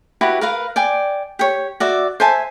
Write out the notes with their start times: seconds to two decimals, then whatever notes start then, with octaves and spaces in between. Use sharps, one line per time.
0.21 E4 F#4 G4 B4
0.41 A#4 B4 F5
0.76 D5 G5 G#5
1.39 G4 C#5
1.80 F#4 D5 E5
2.20 C5 E5 G#5 A5